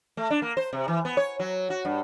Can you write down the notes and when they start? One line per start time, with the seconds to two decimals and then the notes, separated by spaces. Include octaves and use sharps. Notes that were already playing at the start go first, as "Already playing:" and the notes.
0.17 A3
0.30 D4
0.42 A#3
0.57 C5
0.73 C3
0.88 E3
1.05 B3
1.17 C#5
1.40 F#3
1.70 F#4
1.85 G2